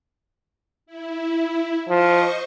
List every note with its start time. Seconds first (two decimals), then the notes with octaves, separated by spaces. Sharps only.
0.86 E4
1.89 F3 C5 D#5 C#6